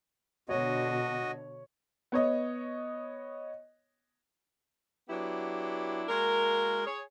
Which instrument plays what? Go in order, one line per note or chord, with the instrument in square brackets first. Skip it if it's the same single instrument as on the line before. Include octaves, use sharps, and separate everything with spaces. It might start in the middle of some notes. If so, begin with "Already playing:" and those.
[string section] B2 D3 [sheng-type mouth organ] F#4 D#5 [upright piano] C#5
[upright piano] B3 C#5 D#5
[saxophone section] F#3 B3 D4 E4 G4
G#3 A#3 F#4 A#4
G#4 C#5